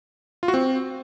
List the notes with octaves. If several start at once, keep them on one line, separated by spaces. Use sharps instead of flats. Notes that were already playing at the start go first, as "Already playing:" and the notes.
F4
F#4
C4